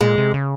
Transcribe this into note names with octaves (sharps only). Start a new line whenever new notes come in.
A#2 G#3
C3
C#3